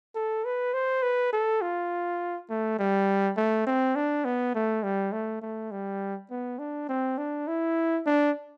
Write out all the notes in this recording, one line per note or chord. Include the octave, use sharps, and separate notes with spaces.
A4
B4
C5
B4
A4
F4
A3
G3
A3
C4
D4
B3
A3
G3
A3
A3
G3
B3
D4
C4
D4
E4
D4